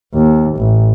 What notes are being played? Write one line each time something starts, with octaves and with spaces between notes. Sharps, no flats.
D#2
A1